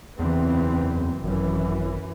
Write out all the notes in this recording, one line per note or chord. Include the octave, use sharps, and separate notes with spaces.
F#1 E2 E3 C4
G#1 F#2 E3